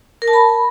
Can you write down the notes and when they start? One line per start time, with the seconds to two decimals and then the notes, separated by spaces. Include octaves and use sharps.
0.22 A#4
0.28 A5
0.33 B5